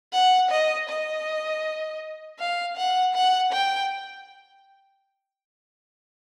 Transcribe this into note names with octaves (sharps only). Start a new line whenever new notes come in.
F#5
D#5
D#5
F5
F#5
F#5
G5